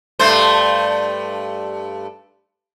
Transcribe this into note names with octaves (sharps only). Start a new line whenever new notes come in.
G2 A3 C5